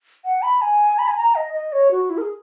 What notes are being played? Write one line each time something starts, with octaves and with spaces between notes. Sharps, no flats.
F#5
B5
G#5
B5
G#5
A#5
D#5
D#5
C#5
F#4
E4
A#4
G#4